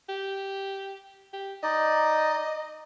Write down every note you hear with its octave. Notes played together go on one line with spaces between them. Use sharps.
G4
G4
D#4 D5 D#5